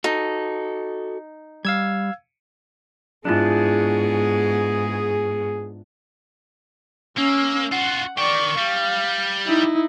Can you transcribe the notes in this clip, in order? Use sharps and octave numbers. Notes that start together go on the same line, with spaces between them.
D#4 F#4 A4
G3 F5 E6 G#6
G#2 B3 D4 E4 F4 G#4
A#3 C#4 E6
F4 F#4 F#5
A#4 D5 G5 C#6
G3 F5
D#4 E4